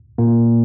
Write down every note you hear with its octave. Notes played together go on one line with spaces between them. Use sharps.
A#2 A#3